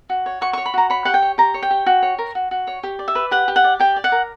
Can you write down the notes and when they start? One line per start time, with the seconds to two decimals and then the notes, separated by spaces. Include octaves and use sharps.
0.10 F#4
0.26 C#5
0.41 F#4 C#6
0.53 C#6
0.58 C#5
0.66 B5
0.74 F#4 A#5
0.90 C#5 B5
1.05 G4 F#5
1.14 G5
1.22 C#5
1.38 G4 A#5
1.54 C#5
1.63 G5
1.71 G4
1.86 F#4
2.02 C#5
2.19 A#4
2.35 F#4
2.51 F#4
2.67 C#5
2.83 G4
2.99 D5
3.08 E5
3.15 B4
3.31 G4 F#5
3.48 G4
3.56 F#5
3.64 D5
3.80 G4 G5
3.96 D5
4.04 F#5
4.12 A#4